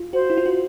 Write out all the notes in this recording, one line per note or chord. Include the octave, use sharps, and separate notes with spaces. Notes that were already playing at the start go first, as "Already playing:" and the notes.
Already playing: F4
F#4 C5
E4
F4
F#4